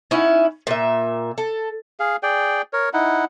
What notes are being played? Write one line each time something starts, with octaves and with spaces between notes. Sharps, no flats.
C#4 D#4 E4 F#5
A#2 E5
A4
G#4 F5
G#4 D5 G5
A#4 C#5
D#4 E4 F#5